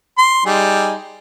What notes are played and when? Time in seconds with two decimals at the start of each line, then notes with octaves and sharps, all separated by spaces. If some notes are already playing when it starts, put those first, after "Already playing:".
0.18 C6
0.46 G3 D#4 G#4